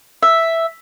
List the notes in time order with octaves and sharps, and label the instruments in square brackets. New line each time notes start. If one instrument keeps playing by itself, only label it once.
[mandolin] E5